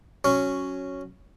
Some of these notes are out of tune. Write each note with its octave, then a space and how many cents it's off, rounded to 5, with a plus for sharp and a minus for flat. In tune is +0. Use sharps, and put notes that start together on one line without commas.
F#3 +0 C#4 +0